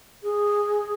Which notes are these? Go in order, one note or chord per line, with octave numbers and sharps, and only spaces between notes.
G#4